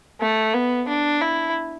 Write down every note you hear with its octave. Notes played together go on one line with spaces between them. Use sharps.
A3
B3
D4
E4